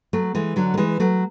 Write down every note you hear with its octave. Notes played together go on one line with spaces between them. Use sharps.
F#3 A3
E3 G#3
D3 F#3
A3
E3 G#3
F#3 A3